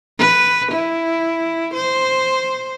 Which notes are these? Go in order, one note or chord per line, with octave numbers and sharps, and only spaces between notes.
B4
E4
C5